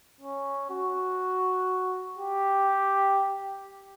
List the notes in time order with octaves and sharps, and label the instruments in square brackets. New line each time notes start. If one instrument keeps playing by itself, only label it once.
[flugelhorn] C#4
F#4
G4